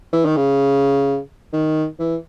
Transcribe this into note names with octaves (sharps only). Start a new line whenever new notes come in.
E3
D#3
C#3
D#3
E3